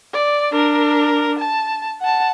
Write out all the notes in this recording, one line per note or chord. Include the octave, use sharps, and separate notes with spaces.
D5
D4 A#4
A5
F#5 A5